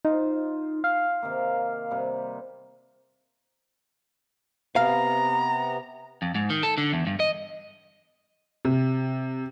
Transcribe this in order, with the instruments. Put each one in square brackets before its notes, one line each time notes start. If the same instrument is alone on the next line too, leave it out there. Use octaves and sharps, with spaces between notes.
[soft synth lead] D#4 [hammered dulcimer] F4 C5
[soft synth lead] F5
[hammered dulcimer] C3 D#3 A#3
C3 G3
[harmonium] C3 B3 [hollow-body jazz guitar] F5 [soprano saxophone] A#5
[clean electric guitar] F2
G#2
D#3
A4
D3
E2
G2
D#5
[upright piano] C3